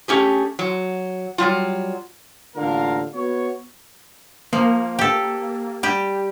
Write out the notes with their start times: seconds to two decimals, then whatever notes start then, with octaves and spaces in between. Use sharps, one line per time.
0.08 A3 C#4 G4 G#4
0.59 F#3
1.38 F#3 G3 F4
2.56 A1 D3 A#3 F4 A#4 F5
3.14 B3 F#4 C#5
4.53 F3 A#3
4.99 G4 A4
5.83 G3 G4